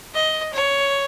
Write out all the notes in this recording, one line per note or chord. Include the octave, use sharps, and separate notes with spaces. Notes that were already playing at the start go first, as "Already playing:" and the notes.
D#5
C#5